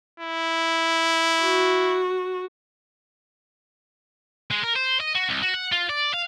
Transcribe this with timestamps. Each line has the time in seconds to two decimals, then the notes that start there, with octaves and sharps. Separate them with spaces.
0.20 E4
1.42 F#4
4.51 G#3
4.64 A#4
4.76 C5
5.00 D#5
5.15 F#4
5.29 C2
5.42 F#4
5.54 F#5
5.72 F4
5.89 D5
6.14 F5